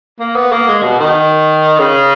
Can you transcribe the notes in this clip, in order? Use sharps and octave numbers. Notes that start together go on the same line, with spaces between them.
A#3
B3
A#3
G#3
B2
D#3
C#3